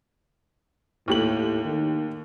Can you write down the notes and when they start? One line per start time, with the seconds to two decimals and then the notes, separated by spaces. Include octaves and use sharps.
1.08 D#2 A2 G4 F#7
1.64 D#3